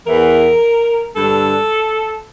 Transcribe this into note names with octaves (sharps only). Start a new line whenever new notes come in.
E2 E3 A#4
G2 D3 A4